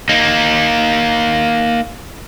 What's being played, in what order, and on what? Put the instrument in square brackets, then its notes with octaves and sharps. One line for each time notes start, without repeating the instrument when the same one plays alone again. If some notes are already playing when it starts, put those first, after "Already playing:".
[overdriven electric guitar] A#3 D#4